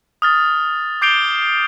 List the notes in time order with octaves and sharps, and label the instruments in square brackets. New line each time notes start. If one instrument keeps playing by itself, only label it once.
[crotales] D#6 F6 A6
D6 G6 C7 D7 F7 G7